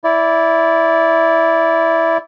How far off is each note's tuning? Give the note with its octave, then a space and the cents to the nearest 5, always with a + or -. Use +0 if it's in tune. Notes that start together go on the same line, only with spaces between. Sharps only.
E4 +0 D5 -15